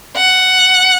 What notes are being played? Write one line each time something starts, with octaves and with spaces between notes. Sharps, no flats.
F#5